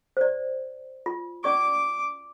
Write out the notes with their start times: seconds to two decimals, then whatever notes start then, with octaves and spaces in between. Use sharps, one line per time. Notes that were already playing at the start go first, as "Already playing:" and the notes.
0.17 C5 D5
1.06 F4
1.44 C#4 D5 C#6 D6